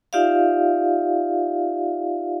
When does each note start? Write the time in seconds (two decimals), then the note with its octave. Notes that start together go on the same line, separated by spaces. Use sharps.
0.13 D#4 F4 G4 D5 E5 F5